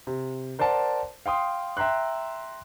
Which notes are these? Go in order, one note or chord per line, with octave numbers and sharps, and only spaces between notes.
C3
A#4 C5 D5 F#5 A5
F5 G5 C6 D#6
E5 G5 A#5 C6 F#6